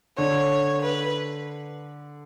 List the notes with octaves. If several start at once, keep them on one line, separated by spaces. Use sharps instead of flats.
D3 C#5
B4